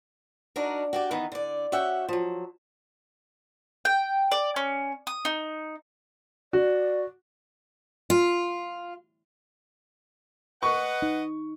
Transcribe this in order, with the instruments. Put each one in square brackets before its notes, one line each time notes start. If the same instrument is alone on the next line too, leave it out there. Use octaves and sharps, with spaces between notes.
[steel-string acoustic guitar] D4 D#4 F#4 A#4
F#4 G4 D5
D#3 E3 B3 D#4
D3 D5
C#4 F#4 E5 F#5 G5
F3 F#3
[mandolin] G5
D5
C#4
D#6
D#4
[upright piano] F#4 [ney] D5
[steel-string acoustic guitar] F4
[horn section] B4 D#5 F#5 [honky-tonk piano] C#6
[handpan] D#4